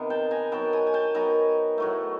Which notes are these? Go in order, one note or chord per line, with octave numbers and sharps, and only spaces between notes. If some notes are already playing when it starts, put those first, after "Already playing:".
Already playing: C3 D#3 B3
G5 A5
G#5 A#5
D#3 F#3 B3 G5 A5
G#5 A#5
G#5
G5 A5
D#3 F#3 B3 G#5 A#5
A2 F#3 A3